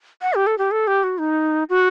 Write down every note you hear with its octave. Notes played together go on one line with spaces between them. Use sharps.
F#5
G4
A4
G4
A4
G4
F#4
D#4
F#4